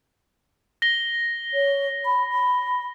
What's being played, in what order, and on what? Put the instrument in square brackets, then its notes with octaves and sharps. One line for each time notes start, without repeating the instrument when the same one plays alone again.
[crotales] A#6 G7
[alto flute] C#5
B5
B5